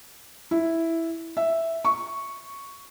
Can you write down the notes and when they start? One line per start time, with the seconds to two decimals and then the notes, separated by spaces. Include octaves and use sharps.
0.51 E4
1.37 E5
1.85 C#6